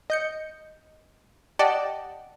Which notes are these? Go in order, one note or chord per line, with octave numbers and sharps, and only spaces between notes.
D#5 G6 C#7
G4 D5 D#5 F#5 G5 A5